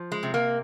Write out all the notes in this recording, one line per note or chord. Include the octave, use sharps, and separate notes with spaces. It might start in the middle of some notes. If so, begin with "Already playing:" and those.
Already playing: F3
G#3
C3
A#3